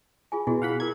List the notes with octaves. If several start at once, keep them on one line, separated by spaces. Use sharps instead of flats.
F4 G#4 G#5
B2 E4 F#4 G#4
F5 F#5 B5
E4 A#4 G#6